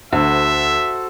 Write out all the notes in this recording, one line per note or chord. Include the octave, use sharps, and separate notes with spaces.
D2 F#4 A4 C5 E5